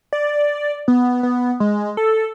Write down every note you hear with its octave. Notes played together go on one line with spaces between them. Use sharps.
D5
B3
B3
G#3
A4